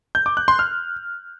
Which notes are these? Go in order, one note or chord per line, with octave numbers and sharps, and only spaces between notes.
G6
D6
F#6
C6
F6